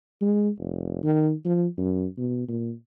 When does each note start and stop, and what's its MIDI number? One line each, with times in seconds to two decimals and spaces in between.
0.21 0.49 56
0.59 1.02 29
1.03 1.33 51
1.45 1.66 53
1.78 2.06 42
2.18 2.48 47
2.49 2.72 46